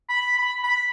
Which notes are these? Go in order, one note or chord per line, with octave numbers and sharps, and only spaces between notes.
B5
B5
B5